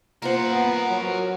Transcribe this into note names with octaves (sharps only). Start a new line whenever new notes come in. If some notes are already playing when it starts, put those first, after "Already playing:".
A#3 F4 A#4 C5 F#5
B3
F#3